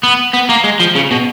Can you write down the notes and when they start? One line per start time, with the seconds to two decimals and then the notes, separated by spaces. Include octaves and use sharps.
0.03 B3
0.34 B3
0.50 A#3
0.64 G#3
0.80 F3
0.96 C#3
1.11 B2